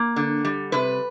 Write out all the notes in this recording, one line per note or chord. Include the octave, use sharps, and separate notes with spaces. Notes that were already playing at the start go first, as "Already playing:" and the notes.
Already playing: A#3
D3
G3
C3 B4